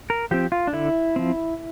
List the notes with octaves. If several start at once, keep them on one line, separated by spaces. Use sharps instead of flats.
A#4
F3 C4 G4
F4
D4
D3 E4
F3 C4